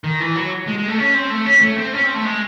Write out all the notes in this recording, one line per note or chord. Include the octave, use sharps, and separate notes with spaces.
D#3
E3
F#3
G#3
G#3
A3
C#4
C4
A3
C#4
A3
C4
C#4
C4
A3
G#3